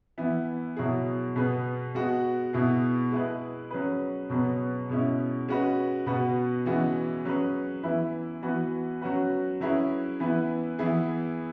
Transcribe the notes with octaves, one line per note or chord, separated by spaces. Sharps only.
E3 B3 E4
B2 F#3 E4 G#4
B2 B3 G#4 B4
G#3 B3 F#4
B2 B3 E4 G#4
G#3 E4 G#4 B4
F#3 C#4 G#4 B4
B2 F#3 B3 G#4 B4
B2 G#3 C#4 E4
G#3 C#4 F#4 B4
B2 B3 F#4 B4
C#3 E3 G#3 B3 F#4
F#3 C#4 G#4 B4
E3 B3 E4 B4
E3 B3 F#4 B4
F#3 C#4 F#4 B4
F#3 C#4 E4 G#4 B4
E3 B3 E4 B4
E3 B3 E4 G#4